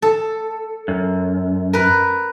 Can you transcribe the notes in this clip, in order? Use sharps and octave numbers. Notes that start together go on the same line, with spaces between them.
A4
F#2
A#4 B4